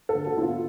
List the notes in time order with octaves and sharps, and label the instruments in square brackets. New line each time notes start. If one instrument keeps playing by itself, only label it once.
[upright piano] A4
D3
F#4
B3 E4
F4